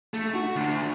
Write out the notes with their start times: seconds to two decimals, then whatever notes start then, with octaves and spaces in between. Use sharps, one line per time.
0.14 A3
0.34 F#4
0.56 D2